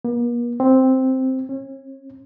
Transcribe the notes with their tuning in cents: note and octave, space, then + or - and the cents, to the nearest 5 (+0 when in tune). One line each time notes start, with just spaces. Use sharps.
A#3 +45
C4 +0
C#4 -40